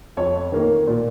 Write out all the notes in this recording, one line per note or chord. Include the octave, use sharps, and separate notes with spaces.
F2 C#5
D#3 A#3
A#2